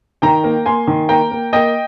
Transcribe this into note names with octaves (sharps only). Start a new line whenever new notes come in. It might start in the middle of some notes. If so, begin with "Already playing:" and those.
D#3 G5 A#5
A#3
A#3 G#5 C6
D#3
A#3 G5 A#5
A#3
A#3 D#5 G5